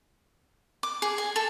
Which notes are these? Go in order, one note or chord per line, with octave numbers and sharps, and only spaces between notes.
D6
G#4
G#5
A4